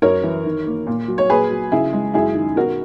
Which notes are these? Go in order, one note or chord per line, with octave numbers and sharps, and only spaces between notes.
F#2 A#4 C#5
E3
D#3
A#3
A#2
F#3
C#5
A#2 G#4 B4
F#3
C#3 E4 G#4
G#3
F#2 E4 G#4
D#3
B2 F#4 A#4